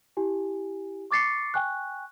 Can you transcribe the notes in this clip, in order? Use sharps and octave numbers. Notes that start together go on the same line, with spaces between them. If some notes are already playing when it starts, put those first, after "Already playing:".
E4 G4 G#5
C#6 D6 A6 C7 C#7
G5 G#5 C#6 F#6